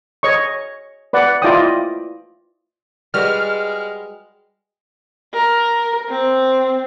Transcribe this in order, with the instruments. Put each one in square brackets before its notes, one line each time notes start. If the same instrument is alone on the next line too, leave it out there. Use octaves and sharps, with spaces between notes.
[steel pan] C#5 D#5 C#6
B4 D5 F#5
E4 F4 D5 D#5 G5 D#6
[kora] G3 F#4 B4 [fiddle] G#3 [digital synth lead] F6
[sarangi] A#4
C4